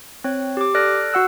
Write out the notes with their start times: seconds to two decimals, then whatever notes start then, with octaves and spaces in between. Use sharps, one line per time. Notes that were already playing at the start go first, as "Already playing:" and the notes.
0.24 C4 C#5
0.57 G4 D6
0.74 A4 D5 F6 F#6 A#6 D7
1.13 F#4 F#5 E6 F#6